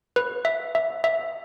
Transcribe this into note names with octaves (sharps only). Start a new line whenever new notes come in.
B4
E5
E5
E5